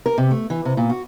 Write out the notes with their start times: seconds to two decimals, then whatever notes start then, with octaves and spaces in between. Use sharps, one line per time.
0.06 A#4
0.18 C3
0.31 A3
0.50 E3
0.65 C3
0.77 A#2
0.90 F#4